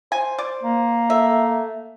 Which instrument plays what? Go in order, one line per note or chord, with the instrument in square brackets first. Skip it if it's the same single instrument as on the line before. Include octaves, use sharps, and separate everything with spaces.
[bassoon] C5 [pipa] G#5
[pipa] D5
[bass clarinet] A#3
[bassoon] A3 [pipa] E5